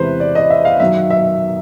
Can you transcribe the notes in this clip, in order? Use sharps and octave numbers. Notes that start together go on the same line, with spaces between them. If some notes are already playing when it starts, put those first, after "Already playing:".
Already playing: E2 C3 E3 G#3 B4 C5
D5
D#5
E5
F5
F#2 D#3 F#3 E5
E5